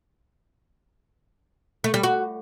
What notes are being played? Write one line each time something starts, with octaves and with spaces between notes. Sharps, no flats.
A3
G3
F#4